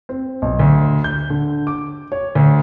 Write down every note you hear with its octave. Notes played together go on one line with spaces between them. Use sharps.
C4
B1
D2
G6
D3
D6
C#5
D2